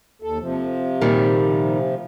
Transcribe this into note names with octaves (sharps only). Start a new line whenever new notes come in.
D#2 A4
C3 F3
A#2 D#3 G3